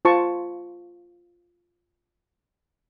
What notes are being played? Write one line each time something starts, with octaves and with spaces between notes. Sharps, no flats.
F4 C5 A5 C#6